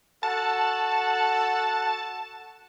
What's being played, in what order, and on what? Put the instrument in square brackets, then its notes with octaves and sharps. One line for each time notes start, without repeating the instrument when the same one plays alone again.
[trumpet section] F#4 A4 F#5 [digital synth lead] A5